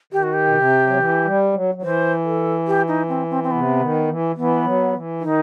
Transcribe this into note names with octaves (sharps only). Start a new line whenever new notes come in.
D#3 G4
F#4
G4
B2
C3
F#3
E3
G3
F#3
F#3
E3 C5
A4
G4
D#4
C4
C4
C4
C3 B3
D#3
E3
E3 B3
F#3
E3
D#3 D#4